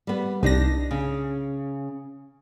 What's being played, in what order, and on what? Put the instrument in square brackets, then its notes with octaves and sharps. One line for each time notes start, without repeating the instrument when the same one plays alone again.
[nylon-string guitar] G3 B3
[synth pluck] C2 A#6 [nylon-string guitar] D4 D#4
[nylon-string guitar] C#3